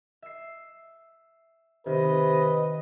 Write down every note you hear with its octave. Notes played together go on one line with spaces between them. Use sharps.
E5 C7
C3 D#3 B4 D#5